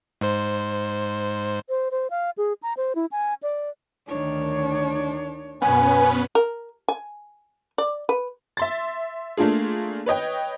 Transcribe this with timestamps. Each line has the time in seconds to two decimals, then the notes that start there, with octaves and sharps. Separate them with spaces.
0.21 G#2 C5
1.69 C5
1.91 C5
2.10 F5
2.38 G#4
2.63 A#5
2.77 C5
2.95 E4
3.12 G#5
3.43 D5
4.08 D2 D#3 D4 C#5
5.62 F#2 B2 B3 C#4 B4 G#5
6.35 A#4
6.88 G#5
7.78 D5
8.09 B4
8.57 E5 C6 A6
9.37 A3 A#3 D4 F4 G#4
10.06 B4 C#5 D#5 G5